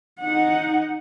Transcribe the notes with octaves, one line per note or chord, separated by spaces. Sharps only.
D#4 F#5